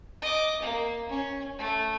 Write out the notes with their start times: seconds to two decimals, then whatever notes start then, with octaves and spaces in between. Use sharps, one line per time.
0.22 D#5 D6
0.63 A#3
1.09 C#4
1.58 A3